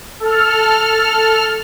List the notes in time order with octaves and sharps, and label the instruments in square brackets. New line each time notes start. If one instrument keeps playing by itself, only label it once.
[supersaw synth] A4 F6